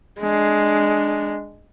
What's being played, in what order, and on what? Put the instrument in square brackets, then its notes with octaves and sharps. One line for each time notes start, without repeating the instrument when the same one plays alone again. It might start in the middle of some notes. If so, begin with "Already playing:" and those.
[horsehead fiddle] G#3 D4